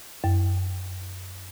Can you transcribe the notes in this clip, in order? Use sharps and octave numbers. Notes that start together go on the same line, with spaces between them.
F#2